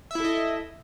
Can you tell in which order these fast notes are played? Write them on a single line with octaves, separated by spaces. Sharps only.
E5 E4 A4 D#5